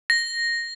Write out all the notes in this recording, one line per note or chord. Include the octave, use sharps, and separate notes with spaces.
A#6